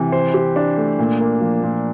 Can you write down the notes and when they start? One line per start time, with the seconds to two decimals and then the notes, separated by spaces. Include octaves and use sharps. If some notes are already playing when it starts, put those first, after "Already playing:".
Already playing: C3 E3
0.12 C5
0.34 G4
0.56 D4
0.77 A3
0.99 A#2
1.20 A#3
1.41 F3
1.63 A#2